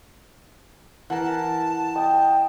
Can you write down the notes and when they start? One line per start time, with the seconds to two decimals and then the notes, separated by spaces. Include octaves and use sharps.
1.10 E3 A#4 F#5 A5
1.95 D#5 G5